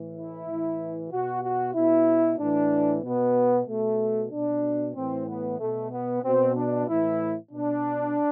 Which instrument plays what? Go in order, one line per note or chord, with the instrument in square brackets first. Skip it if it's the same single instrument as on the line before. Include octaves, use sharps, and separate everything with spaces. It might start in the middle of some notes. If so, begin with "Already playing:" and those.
Already playing: [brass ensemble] A2 E3
E4
A2 E3
B2 F#4
F#4
B2 E4
A2 E3 D4
B2 B3
B2 A3
B2 D4
A2 E3 C4
B3
B2 A3
B3
B2 C4
D4
A2 E3 E4
B2 D4